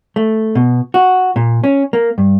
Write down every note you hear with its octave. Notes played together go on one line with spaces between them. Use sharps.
A3
B2
F#4
A#2
C#4
A#3
G2